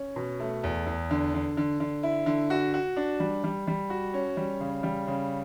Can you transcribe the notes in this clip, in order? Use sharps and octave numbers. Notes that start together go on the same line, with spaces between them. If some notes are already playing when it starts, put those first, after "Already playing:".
Already playing: C#4
B2
A3
E2
E2
D3
D3
D3
D3
E4
D3
F#4
F#4
D4
G3
G3
G3
F#4
C#4
G3
C#3
G3
C#3